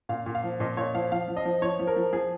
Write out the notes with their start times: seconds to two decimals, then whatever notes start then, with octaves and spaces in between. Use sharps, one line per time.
0.09 A#2 F5
0.26 A#2
0.35 F5
0.43 F3
0.60 A#2 D#5
0.77 A#2 C#5
0.94 F3 F5
1.12 F3 F5
1.28 F3
1.37 D#5
1.45 F3
1.62 F3 C#5
1.80 F3
1.87 A#4
1.96 F3
2.13 F3 G#4